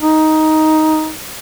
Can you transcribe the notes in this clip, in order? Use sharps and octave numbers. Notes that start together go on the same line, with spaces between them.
D#4